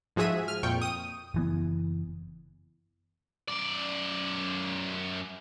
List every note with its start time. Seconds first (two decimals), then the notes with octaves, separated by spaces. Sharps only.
0.16 G#2 F3 F#4 G#4 E5 D#7
0.48 F6
0.63 F2 A#2 G5 C#6
0.82 D#6 D#7
1.34 F#1 E3 B3
3.48 F#2 D5